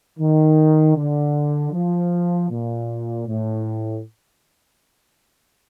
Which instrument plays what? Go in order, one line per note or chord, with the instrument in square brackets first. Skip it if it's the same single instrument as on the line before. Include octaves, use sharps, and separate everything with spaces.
[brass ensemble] D#3
D3
F3
A#2
A2